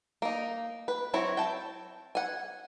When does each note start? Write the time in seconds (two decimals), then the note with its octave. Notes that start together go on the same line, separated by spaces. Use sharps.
0.22 A#3 D#4
0.88 B4
1.14 F#3 C4 E4 C#5
1.37 G5 A5
2.15 F#5 G#5